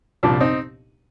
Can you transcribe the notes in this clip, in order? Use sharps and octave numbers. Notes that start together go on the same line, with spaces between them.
C2 A#2 F3 D4
C4 D#4